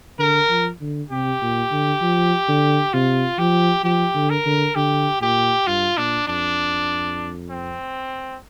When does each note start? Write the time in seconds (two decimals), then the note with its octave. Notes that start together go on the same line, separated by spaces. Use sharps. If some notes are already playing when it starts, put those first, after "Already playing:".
0.19 D3 A#4
0.49 F3
0.81 D3
1.10 C3 G4
1.41 A#2
1.72 D3
2.01 F3
2.48 D3
2.93 C3 F4
3.38 F3 G4
3.84 F3 G4
4.15 D3
4.30 A#4
4.46 D3
4.75 D3 G4
5.21 A#2 G4
5.67 G2 F4
5.97 A#2 D4
6.28 F2 D4
7.50 C4